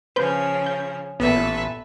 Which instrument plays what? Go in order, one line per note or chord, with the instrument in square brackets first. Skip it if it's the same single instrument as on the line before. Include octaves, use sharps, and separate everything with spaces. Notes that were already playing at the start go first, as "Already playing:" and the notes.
[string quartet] C#3 F3 C#4 [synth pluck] B4 C5 G6
[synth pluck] G6
[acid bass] A1 [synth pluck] A#2 B3 [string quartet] A4 B4 E5